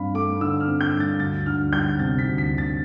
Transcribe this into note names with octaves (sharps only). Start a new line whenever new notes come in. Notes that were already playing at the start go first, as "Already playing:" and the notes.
Already playing: G2 C4 F5 B5
A3 D6
D3 E6
F6
C4
G6
G2
A6
D2 A6
D2 F6
G3 G6
C3 A6
B6
D2
B6
D2
A6